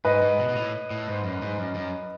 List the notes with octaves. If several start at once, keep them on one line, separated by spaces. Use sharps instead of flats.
G#2 B4 D#5
G#2
B2
B2
A2
A2
G#2
F#2
G#2
F#2
F#2